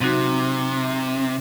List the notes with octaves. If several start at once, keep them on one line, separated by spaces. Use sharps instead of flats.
C3 F#3 C4 D#4 F#4